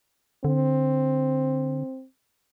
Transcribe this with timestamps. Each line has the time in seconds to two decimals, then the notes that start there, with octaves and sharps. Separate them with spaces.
0.45 D3 C4